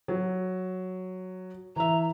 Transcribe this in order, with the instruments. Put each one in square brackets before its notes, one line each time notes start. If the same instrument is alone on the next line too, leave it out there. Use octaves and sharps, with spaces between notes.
[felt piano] F#3
[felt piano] E3 E5 [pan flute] A#5